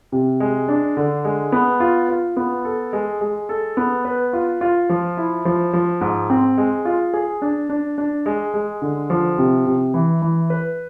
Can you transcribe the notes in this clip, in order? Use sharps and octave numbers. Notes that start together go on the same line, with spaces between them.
C3
G#3
D4
D3
G#3
B3
F4
F4
B3
A4
G#3
G#3
A4
B3
B4
F4
F4
F3
E4
F3
F3
G#2
C4
G#3
F4
G#4
D4
D4
D4
G#3
G#3
D3
F3
C3
C3
E3
E3
B4